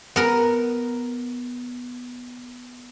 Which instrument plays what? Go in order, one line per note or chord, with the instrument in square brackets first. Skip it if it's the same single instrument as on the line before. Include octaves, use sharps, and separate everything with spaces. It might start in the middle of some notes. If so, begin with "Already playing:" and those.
[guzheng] B3 A#4 A#5